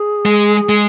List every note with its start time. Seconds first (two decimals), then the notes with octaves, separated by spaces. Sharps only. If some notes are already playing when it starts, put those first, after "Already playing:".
Already playing: G#4
0.25 G#3
0.69 G#3